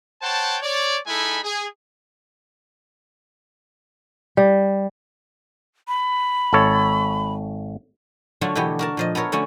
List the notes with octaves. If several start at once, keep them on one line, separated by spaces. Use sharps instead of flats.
C5 C#5 F#5 G5 A5
C#5 D5
G#3 D#4 E4 A4 G#5 B5
G#4
G3
B5
G#1 A4 C#5
D3 F#3 A3 F4 F#4
B2 D3 E3 B3 G4
F#4 A#4 A5
A#2 F3 D#5
B3 A4 A#4 C#5
D3 A3 C#4 F#4